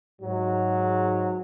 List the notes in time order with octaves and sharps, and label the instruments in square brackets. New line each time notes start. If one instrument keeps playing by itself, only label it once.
[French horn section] G#2 [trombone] F#3